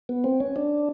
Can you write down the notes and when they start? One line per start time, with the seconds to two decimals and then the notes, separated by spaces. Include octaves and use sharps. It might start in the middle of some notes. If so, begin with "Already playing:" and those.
0.09 B3
0.24 C4
0.40 C#4
0.56 D4